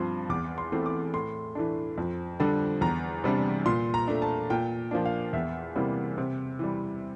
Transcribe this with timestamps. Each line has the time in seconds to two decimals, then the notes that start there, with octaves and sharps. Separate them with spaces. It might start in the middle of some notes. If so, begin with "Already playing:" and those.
Already playing: G2 F3 C4 C6
0.29 E2 D6
0.58 C6
0.72 E3 A3 C4
0.86 D6
1.14 A2 C6
1.55 E3 A3 D4
1.98 F2
2.40 D3 G3 D4
2.81 E2 A#5
3.24 C3 G3 D4
3.66 A#2 C6
3.94 A#5
4.08 A3 D4
4.22 A5
4.50 A#2 G5
4.91 F3 A#3 D4
5.05 F5
5.33 E2 E5
5.76 C3 E3 G3 A#3
6.18 C3
6.59 E3 G3